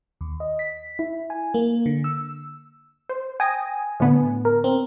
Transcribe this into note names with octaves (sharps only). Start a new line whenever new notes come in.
D#2
D#5
B6
E4
G#5
A#3
D3
E6
C5
G5 G#5 D#6 A#6
A2 D3 B3
A#4
C4